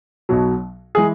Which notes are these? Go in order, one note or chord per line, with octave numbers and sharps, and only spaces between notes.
B1 B2 F#3
E3 G#3 G#4